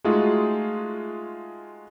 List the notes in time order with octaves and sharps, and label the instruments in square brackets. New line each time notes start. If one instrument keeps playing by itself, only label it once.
[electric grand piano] G#3 A3 D#4 F4 F#4 G#4